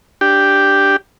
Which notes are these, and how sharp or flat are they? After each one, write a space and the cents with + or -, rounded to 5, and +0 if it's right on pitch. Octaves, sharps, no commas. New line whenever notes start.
D4 +0 G4 +0